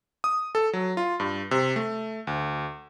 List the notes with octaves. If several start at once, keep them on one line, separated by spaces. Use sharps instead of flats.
D#6
A4
F#3
F4
G2
C3
A3
D2